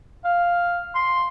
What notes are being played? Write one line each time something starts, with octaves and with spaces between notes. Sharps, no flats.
F5
C6